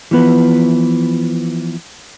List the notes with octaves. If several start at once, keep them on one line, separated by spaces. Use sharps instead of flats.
E3 F3 B3 B4